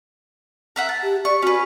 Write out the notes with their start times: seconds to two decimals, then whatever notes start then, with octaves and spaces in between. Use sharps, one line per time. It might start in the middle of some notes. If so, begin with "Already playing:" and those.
0.76 A#4 E5 F#5
0.89 A5
1.03 G4
1.25 D5 C#6
1.42 C#4 F#4 B4